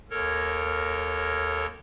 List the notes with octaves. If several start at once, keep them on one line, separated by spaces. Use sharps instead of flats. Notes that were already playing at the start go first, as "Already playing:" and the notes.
D#2 A4 A#4 C#5 G#6